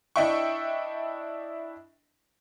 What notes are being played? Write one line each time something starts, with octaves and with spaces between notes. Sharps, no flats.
D4 E4 D#5 E5 G5 C#6